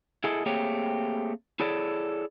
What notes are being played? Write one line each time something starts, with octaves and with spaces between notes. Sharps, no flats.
E4 G#4 A4 D#5
A3 A#3 C4 G4 G#4 C#5
E4 G#4 A4 C#5 D5